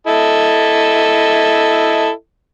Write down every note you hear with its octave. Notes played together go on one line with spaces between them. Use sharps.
E4 A4 D#5